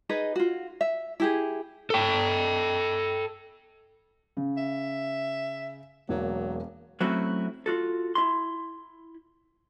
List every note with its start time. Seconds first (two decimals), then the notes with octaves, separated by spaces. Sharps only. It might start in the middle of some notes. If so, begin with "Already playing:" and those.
0.09 D#4 G#4 B4 D#5
0.36 F4 F#4
0.81 E5
1.20 E4 G4 G#4
1.90 A4 G5
4.37 C#3
4.57 E5
6.09 E1 F#3 A#3
7.01 F#3 A3 C4 C#4 E4 F#4
7.66 F4 F#4 A4
8.15 E4 C6